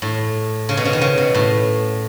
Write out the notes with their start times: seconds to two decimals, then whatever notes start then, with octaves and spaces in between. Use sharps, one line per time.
0.02 A2
0.69 C#3
0.77 B2
0.85 C#3
0.93 D#3
1.01 C#3
1.18 B2
1.34 A2